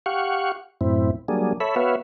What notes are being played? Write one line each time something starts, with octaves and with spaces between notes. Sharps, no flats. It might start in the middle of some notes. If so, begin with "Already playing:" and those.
G4 F5 F#5 C#6
F#2 A2 C4 E4
F#3 G3 A#3 D4 G#4
A4 C#5 E5 B5
B3 F#4 B4 C#5 E5 F5